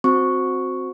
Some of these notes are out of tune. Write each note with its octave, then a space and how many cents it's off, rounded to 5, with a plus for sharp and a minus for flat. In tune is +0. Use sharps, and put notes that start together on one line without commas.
C4 +0 F#4 -15 C#6 +0